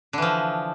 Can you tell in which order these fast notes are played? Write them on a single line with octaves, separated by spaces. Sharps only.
D3 E3 F3